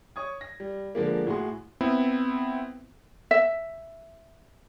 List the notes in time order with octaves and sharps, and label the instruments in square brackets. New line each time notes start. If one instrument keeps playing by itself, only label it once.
[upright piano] C#5 C#6 D#6 G#6
A#6
G3
D3 F3 G#3 A#3
A2 F#4 G#4 C6
[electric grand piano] B3 C4 E4
[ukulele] E5